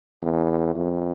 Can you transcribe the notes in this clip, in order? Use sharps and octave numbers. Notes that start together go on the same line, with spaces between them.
E2
F2